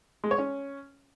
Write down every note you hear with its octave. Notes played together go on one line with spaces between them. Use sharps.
G#3
C#5
C#4